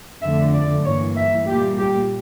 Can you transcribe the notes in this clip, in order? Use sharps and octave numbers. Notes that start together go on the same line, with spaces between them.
F2 D3 A3 E5
D5
G2 E3 A#3 C#5
E5
A#2 G3 A#3 G4
G4